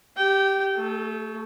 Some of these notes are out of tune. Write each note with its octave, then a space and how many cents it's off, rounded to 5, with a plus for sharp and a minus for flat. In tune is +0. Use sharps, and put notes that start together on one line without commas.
G4 +0 G5 -20
A3 +20 A4 -35